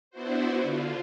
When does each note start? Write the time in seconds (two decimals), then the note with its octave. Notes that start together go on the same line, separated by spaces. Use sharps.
0.11 B3 D4 E4 F#4 C5
0.63 D3 F4